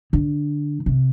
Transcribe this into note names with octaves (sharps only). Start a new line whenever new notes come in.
D3
C3